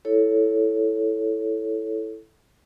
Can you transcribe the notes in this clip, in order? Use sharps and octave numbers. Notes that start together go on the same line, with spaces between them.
E4 A4 C#5